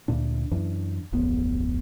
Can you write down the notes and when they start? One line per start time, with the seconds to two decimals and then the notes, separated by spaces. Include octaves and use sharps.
0.08 D2 A#2 D4
0.52 F#2 E3 D4
1.12 D1 A1 F2 B3